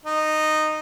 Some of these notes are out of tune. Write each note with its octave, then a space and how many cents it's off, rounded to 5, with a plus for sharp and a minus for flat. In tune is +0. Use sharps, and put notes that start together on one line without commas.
D#4 -15